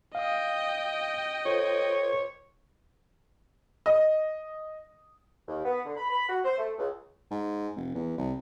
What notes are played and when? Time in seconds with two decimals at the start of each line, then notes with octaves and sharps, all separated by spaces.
0.15 D#5 F5 G5 D#6
1.45 F4 A4 C5 C#5
3.86 D#5
5.48 D#2
5.65 B3
5.85 D3
5.97 B5
6.10 B5
6.29 F#4
6.44 C5
6.58 A3
6.78 C#2
7.31 G#2
7.76 F1
7.95 E2
8.18 C2